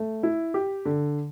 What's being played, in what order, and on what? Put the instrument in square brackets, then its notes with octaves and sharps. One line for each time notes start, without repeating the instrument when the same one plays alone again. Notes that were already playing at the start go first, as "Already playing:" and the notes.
Already playing: [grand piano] A3
E4
G4
D3